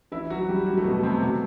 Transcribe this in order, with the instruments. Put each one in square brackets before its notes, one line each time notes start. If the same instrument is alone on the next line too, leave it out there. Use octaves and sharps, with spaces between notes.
[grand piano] E3 E4
F#3 F#4
G3 G4
F#3 F#4
A3
B2 B3
C3 C4
F#3 F#4